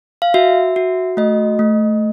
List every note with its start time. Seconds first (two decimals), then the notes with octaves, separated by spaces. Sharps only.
0.22 F5
0.34 F#4 E5
0.76 F#4
1.17 A3 D#5
1.59 A3